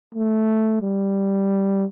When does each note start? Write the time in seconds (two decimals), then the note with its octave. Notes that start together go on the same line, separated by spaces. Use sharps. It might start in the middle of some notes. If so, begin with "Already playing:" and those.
0.15 A3
0.82 G3